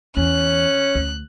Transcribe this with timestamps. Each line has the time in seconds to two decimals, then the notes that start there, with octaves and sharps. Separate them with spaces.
0.17 E2 C#4 F#6
0.95 D2